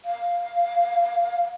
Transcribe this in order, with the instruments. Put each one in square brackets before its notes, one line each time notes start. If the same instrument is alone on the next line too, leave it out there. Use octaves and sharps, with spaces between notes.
[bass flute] F5